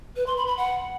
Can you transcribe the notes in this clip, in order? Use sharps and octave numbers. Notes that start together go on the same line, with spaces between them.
B4
C6
B5
B5
F#5